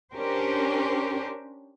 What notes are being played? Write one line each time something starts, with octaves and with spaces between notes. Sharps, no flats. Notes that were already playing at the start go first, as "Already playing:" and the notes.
C#4 D4 G4 A#4 C5